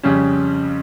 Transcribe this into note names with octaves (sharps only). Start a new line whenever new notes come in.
F2 C#3 G3 C#4